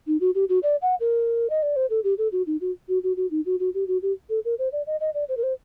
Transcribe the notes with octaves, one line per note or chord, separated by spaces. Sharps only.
D#4
F#4
G4
F#4
D5
F#5
A#4
D#5
D5
C5
A4
G4
A4
F#4
D#4
F#4
F#4
F#4
F#4
D#4
F#4
F#4
G4
F#4
G4
A4
A#4
C5
D5
D#5
D#5
D5
C5
A#4
C5